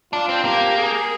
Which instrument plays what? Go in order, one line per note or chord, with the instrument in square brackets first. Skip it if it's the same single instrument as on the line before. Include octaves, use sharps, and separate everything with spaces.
[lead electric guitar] D4 [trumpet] F4
[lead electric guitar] C4
[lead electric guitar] A#3 [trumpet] G4
[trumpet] G#4